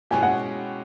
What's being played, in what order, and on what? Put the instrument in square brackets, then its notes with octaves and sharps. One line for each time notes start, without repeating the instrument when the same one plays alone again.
[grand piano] B2 G#3 C#4 E4 G4 [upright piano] G#5
[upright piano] F#5